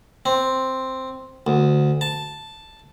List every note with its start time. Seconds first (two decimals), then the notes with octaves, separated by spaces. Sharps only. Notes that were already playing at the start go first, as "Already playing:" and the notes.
0.26 C4
1.47 D2
2.01 A5